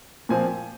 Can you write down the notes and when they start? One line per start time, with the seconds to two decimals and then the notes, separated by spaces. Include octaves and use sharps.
0.29 A#2 F3 C4 G#5